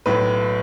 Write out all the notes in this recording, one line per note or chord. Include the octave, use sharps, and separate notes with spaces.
B1 A2 F#3 B4